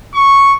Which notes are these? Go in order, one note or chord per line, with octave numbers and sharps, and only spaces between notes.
C#6